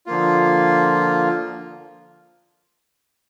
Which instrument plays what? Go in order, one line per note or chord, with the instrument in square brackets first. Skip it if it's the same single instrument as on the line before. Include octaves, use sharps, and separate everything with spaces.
[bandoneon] D3 F3 A#3 F4